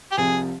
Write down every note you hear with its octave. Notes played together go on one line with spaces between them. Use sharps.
G4
C2 C3 F3 G#4